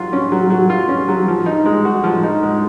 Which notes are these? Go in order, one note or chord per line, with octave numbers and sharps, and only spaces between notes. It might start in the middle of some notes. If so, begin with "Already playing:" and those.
Already playing: F#3 F4
C#4
F#3
F#3
F4
C#4
F#3
F3
D#4
G#3
F#4
F3
D#4
G#3